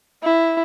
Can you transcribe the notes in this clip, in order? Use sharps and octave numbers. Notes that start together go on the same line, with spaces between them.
E4